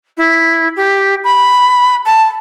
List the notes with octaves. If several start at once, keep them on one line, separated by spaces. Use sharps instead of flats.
E4
G4
B5
A5